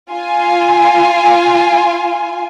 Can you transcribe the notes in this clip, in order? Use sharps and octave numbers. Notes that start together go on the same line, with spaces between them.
F4 G#5